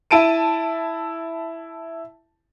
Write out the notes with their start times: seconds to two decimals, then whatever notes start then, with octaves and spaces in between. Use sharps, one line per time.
0.11 E4 A5 D7 D#7